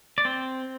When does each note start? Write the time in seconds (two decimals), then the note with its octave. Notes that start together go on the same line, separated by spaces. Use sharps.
0.18 D5
0.25 C4 C5